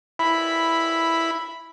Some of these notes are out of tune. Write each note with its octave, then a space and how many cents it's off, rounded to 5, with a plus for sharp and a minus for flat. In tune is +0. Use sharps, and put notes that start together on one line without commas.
E4 +0 B5 +0